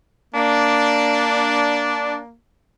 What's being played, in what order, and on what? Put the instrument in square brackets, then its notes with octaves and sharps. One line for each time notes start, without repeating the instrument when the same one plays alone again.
[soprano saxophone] A#3 [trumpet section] D4